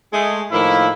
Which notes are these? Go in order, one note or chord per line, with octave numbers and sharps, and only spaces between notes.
G#3 A3 G#4
A2 D#3 F3 A#3 E4